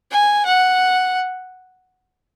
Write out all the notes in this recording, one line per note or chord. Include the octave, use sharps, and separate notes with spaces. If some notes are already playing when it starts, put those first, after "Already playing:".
G#5
F#5